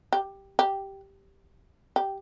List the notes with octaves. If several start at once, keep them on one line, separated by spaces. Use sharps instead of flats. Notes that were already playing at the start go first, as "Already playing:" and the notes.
G4
G4
G4